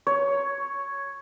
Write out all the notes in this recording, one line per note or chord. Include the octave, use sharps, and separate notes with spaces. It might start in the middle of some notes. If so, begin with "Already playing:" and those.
C#5